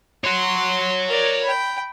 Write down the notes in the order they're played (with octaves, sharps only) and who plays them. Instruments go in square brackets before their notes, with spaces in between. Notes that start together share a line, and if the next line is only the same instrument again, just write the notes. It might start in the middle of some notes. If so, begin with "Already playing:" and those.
[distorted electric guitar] C#5 F#5 [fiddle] C6
[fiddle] A#4 D5
G5 B5